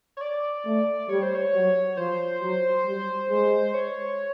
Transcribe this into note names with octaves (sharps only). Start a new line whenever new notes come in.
C#5
D5
A3
G3 C#5
C5
C#5
F#3
F3 C5
F#3
G3
G#3
C#5